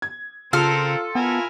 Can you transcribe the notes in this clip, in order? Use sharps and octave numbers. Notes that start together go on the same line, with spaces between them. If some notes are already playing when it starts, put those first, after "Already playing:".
G#6
C#3 C4 F4 A4 A#4 F6
B3 E4 A#4 G#5